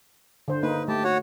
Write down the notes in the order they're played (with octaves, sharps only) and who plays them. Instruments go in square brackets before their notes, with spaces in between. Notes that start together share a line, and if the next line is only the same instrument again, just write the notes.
[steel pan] D3 C5
[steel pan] A#3 D#4 [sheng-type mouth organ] B4
[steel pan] A3 [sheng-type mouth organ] G4 A5
[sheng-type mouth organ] F#4 C#5 F#5